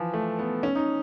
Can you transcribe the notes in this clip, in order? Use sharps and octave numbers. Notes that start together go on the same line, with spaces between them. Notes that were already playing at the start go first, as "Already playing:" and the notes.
Already playing: E3 F3
A3
B3
C#4
D#4